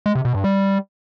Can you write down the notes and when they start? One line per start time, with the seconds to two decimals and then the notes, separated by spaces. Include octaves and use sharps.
0.06 G#3
0.15 C3
0.25 B2
0.34 G2
0.44 G3